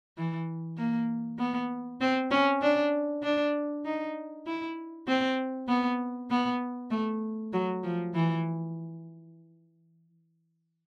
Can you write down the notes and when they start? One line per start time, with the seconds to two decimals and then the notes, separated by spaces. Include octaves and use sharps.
0.17 E3
0.78 A#3
1.39 B3
2.01 C4
2.31 C#4
2.62 D4
3.23 D4
3.85 D#4
4.46 E4
5.08 C4
5.68 B3
6.30 B3
6.91 A3
7.53 F#3
7.83 F3
8.14 E3